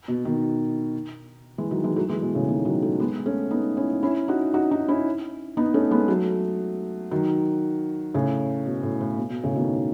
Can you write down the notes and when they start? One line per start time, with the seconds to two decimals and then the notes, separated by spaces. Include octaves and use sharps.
0.08 B2
0.25 B2 D#3
1.58 E3 G#3
1.71 D#3 F#3
1.84 E3 G#3
1.96 F#3 A3
2.10 E3 G#3
2.22 B2
2.35 A2 C#3
2.48 B2 D#3
2.65 D#3 F#3
2.82 F#3 A3
3.00 G#3 B3
3.26 A3 C#4
3.51 B3 D#4
3.77 C#4 E4
4.03 C#4 E4
4.28 D#4 F#4
4.54 D#4 F#4
4.71 D#4 F#4
4.88 C#4 E4
5.57 B3 D#4
5.74 A3 C#4
5.91 G#3 B3
6.08 F#3 A3
7.11 D#3 F#3
8.14 A2 C#3
8.66 B2
8.83 A2
9.01 A2
9.17 B2
9.30 B2
9.44 A2 C#3
9.56 B2 D#3